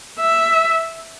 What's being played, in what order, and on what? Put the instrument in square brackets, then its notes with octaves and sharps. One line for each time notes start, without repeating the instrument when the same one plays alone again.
[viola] E5